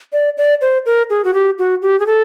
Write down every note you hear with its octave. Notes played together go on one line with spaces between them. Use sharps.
D5
D5
C5
A#4
G#4
F#4
G4
F#4
G4
G#4
A4